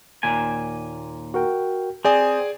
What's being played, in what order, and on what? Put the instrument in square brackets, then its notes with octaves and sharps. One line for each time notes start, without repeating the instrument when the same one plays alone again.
[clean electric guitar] D#2 A#2 G#5
[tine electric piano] F#4 A#4 G5
[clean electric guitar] C4 [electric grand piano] G#4 D5 G#5 [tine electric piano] C6 D#6